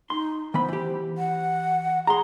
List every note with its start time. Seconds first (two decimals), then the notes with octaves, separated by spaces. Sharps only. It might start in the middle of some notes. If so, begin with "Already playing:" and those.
0.10 D#4 C6
0.54 E3 B3 C5 B5
0.68 E3 G4
1.18 F#5
2.07 G#4 A#5 C6